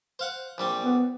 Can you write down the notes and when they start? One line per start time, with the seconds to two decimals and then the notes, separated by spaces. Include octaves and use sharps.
0.19 C5 F5 F#5
0.58 A#1 G3 C4
0.84 B3